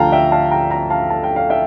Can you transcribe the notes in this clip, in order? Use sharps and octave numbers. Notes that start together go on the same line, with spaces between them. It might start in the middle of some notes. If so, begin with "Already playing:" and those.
Already playing: D2 D3 F3 F5 G5 A5 A#5
E5 G5
F5 A5
G5 A#5
G5 A#5
F5 A5
A5
G5
F5
E5 G5